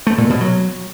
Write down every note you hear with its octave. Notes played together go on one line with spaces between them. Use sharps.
A3
A#2
B2
F#3